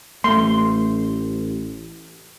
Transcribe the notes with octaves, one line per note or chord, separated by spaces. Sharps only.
A1 A3 C6